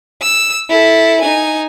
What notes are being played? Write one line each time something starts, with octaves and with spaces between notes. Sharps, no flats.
E6
E4 A4
D#4 G#5